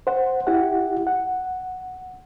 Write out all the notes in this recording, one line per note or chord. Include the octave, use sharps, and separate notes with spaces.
C5 F#5
E4 G4 F#5
F#5